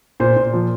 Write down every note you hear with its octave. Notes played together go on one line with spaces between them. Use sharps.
A#2 C5
A#2
F3